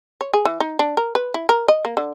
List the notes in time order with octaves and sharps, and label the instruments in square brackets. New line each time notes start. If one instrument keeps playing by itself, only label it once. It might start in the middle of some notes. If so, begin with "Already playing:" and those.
[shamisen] C#5
G#4
E3
D#4
D4
A#4
B4
E4
A#4
D#5
A#3
D3